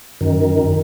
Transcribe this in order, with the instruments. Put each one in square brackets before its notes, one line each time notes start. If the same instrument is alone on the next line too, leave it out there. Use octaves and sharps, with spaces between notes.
[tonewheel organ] F#2 D#3